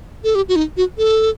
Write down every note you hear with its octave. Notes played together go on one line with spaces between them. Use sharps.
A4
G4
F#4
D#4
F#4
A4